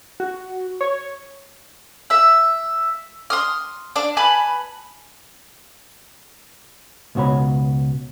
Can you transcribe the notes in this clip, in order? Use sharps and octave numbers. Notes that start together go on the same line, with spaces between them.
F#4
C#5
E5 E6
C6 D#6 F6
D4
B4 G#5 A5 B5
C#2 B2 F#4 C#5 B5